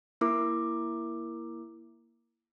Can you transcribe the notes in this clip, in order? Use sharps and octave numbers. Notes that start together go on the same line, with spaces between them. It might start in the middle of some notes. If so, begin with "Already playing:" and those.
A#3 E4 A#4 D6